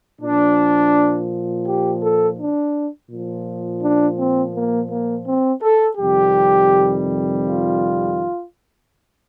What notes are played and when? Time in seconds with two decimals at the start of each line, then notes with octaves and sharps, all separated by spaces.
0.21 A#2 F3 D4
1.65 G4
2.01 A4
2.38 D4
3.09 A#2 F3
3.82 D4
4.18 C4
4.54 A#3
4.90 A#3
5.26 C4
5.62 A4
5.97 F2 C3 D#3 G3 G4
7.42 F4